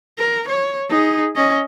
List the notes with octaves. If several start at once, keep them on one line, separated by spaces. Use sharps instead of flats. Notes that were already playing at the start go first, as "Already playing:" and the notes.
A#4
C#5
D#4 G#4
C#4 D#5